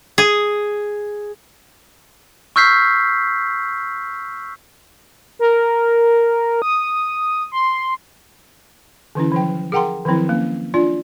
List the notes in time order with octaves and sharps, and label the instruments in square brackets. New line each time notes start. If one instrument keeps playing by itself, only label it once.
[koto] G#4
[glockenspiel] C#6 E6 F6 G6 B6 C7
[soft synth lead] A#4
D#6
C6
[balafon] D3 E3 C#4 E4
F3 F#3 G5
G#4 A#4 F#5 G5 A#5 C6
D#3 F3 F#3 C4 E4
A#3 C#4
D4 F4 D5